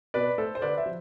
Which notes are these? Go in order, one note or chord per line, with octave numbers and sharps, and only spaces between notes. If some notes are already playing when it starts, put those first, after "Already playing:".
B2 B4 D5
A3 A4 C5
C5
D3 B4 D5
C5 E5
F3